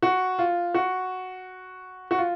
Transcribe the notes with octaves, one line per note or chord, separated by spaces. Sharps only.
F#4
F4
F#4
F#4
F4